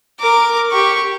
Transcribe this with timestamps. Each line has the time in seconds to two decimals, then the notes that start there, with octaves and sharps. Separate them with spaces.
0.20 A#4 D6
0.71 G4 C#6